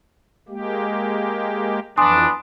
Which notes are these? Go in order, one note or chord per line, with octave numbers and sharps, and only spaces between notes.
G#3 A#3 G4
F2 E3 B3 D4 G#5 C6 D#6